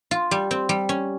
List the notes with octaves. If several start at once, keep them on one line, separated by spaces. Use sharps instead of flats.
F4
G3
C4
G3
C#4